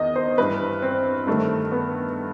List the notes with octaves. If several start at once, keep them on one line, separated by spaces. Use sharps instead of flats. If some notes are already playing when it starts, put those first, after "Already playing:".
Already playing: E2 D#3 D#5
C5
G2 E3 B4
C4
G2 D#3 A3
B3